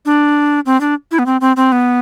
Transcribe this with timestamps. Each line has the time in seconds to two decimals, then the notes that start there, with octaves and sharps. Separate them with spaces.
0.06 D4
0.66 C4
0.81 D4
1.11 E4
1.19 B3
1.26 C4
1.41 C4
1.56 C4
1.72 B3